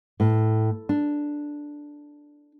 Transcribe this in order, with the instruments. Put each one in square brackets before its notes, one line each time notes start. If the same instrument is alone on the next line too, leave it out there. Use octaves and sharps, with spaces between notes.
[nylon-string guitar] A2
D4